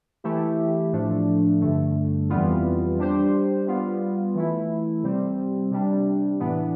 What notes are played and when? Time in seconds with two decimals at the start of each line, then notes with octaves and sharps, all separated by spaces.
0.24 E3 A3 E4 G4
0.93 A2 F3 A3 D4
1.61 G2 D3 A3
2.30 F2 E3 G3 B3 F4
2.98 G3 D4 G4 C5
3.67 G3 B3 F4
4.35 E3 A3 E4
5.03 C3 G3 C4
5.71 C3 G3 D4
6.40 A2 E3 B3 D4